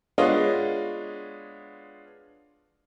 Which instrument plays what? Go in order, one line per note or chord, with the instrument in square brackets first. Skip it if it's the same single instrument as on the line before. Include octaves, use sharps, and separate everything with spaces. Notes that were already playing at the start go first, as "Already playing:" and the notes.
[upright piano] G#3 B3 D4 F4 C#5 D#5